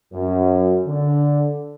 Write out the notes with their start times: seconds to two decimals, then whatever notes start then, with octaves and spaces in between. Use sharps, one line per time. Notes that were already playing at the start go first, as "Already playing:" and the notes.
0.12 F#2
0.86 D3